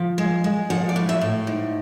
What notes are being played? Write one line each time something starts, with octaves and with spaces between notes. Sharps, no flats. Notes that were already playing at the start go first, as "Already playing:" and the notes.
Already playing: F3
G#3
G#3
F3 F#5
D5
A2
E5
A2
G#2